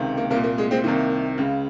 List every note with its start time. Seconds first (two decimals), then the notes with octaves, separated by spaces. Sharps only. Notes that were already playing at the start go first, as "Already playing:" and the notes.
Already playing: C#2 C3 D#3
0.17 A#3
0.30 C2 A#3
0.35 A#2
0.44 A#3
0.58 G#3
0.71 G#3 C4
0.83 C2 C3 D#3 A#3
1.38 C#2 C#3